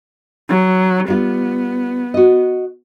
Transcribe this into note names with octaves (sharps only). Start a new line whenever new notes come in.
F#3
G3 B3 F4
F#4 D#5